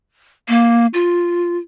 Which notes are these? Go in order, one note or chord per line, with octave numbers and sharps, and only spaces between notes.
A#3
F4